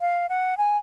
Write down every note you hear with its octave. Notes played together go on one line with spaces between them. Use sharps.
F5
F#5
G#5